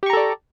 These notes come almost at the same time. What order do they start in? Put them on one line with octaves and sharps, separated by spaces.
G4 C#6 A#5 A4 D5